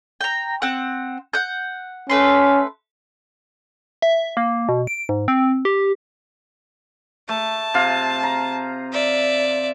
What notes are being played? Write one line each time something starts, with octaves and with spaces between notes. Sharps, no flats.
G5 A#5
C4 F#5
F#5 G6
A3 C#4 B4 C6
E5
A#3
B2
D7
G#2
C4
G4
A3 A5
C3 F4 F5
A#5
D5 E5